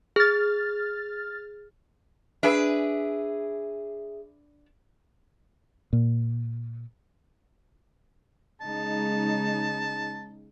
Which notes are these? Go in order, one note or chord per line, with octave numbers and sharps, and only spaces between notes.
G#4 F6 A6
D4 G#4 B4 E5
A#2
C#3 G#3 D#4 A5